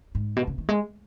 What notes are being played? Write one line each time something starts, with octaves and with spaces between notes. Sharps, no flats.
G#2
B2
C#3
D#3
G#3